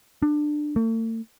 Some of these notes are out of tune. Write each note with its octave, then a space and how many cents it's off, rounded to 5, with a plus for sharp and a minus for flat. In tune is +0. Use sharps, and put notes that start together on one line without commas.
D4 +20
A3 +45